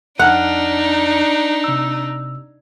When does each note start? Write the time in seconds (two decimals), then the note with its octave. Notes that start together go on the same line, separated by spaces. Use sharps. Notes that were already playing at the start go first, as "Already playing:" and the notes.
0.19 F2 D4 D#4 F#5 A5 F6
1.64 C3 E6